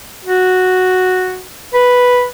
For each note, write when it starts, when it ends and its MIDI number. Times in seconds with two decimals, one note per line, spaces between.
0.24 1.45 66
1.74 2.26 71